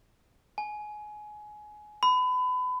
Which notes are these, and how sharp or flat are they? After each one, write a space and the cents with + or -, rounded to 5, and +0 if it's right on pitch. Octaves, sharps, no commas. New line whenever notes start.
G#5 +20
B5 +30